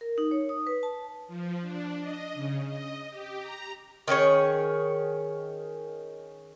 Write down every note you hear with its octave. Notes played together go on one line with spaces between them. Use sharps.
A#4
D#4
C#5
D#6
B4
A5
F3
D4
D#5
C#3
D#5
G4
A#5
D#3 C#4 G#4 C#5